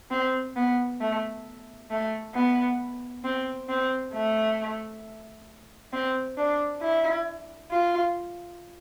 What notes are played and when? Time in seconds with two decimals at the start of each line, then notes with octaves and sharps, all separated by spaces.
0.11 C4
0.56 B3
1.00 A3
1.91 A3
2.35 B3
3.24 C4
3.69 C4
4.13 A3
5.93 C4
6.38 D4
6.82 E4
7.71 F4